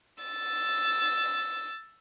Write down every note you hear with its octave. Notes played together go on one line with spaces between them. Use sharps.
E6 A6